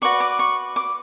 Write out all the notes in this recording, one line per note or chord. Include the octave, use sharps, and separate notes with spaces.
F#4 B4 D5 C#6
D6
C#6
D6